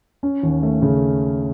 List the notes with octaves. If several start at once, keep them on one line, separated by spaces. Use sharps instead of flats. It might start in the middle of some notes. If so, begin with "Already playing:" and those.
C#4
D#2
A3
C#3